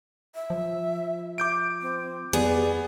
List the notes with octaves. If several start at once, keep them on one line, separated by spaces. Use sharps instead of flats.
E5
F3
D6 G6 D7
C4
F2 B3 G#4 D5